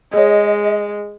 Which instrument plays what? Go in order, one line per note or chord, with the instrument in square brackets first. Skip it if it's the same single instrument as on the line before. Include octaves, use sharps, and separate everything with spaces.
[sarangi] G#3 [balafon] G#4 C#5 [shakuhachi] D#5